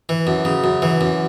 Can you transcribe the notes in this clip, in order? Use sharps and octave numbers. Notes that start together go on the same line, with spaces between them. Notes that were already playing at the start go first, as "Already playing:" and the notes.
E3
F#2
C#3
F#2
E3
F#2